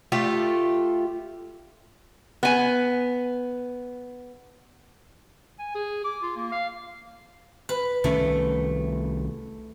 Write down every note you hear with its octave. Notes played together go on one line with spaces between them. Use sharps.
A3 F4 G4
B3 G#5
G#5
G#4
D6
F4
A#3
F5
B4
C2 D#3 A3 C#4